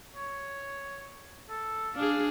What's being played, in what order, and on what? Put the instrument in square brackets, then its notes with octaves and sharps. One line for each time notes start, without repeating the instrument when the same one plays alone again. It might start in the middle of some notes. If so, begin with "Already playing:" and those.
[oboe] C#5
A4
[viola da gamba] D4 G#4 [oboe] F5